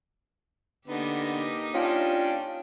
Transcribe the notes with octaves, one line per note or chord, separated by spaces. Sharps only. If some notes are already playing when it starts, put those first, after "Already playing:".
D3 A#3 B3 D#4 G4
C#4 D4 F4 G5